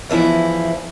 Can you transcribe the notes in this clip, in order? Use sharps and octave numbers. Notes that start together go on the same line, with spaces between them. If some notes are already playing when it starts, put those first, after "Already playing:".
E2 E3 F3 E4